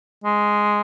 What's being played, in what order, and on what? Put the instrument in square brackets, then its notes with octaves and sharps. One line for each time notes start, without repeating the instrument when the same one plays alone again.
[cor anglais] G#3